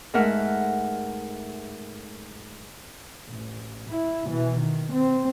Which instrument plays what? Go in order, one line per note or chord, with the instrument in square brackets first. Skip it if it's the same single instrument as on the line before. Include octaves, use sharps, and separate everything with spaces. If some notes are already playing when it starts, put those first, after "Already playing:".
[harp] G#2 A3 A#4 E5 F#5 F6
[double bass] A1
E4
B2 E3
D#3
C4